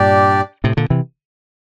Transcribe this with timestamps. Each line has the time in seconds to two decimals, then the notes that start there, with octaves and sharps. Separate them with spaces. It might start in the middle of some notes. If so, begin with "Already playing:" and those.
Already playing: G2 A#2 D4 G4 D5
0.64 A2 C3
0.77 A#2 D3
0.90 C3 E3